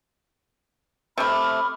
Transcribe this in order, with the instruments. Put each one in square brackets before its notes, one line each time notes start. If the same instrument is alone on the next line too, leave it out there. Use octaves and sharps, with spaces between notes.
[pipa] C3 A3 [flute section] B5 D6 F6